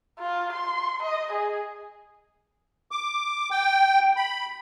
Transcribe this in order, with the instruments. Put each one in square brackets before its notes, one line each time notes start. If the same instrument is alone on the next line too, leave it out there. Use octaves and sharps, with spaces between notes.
[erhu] F4
C6
D#5
G#4
[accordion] D6
G5
B5